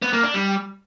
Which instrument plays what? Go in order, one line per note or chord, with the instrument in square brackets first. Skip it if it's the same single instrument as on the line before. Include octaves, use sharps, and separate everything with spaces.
[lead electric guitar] B3
A#3
D4
G3